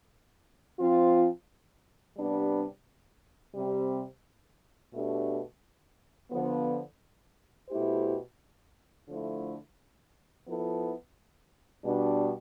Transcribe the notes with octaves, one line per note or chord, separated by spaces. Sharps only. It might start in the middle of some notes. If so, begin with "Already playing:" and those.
F3 C4 F4
C3 G3 B3 D4
C3 G3 C4
B2 A3 D4 G4
D3 F3 B3
B2 A3 E4 G4 C5
D3 F3 A3 E4
F3 B3 E4 A4
B2 G3 D4